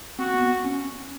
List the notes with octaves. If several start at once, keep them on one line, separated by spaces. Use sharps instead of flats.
C4 F#4
B3
C#4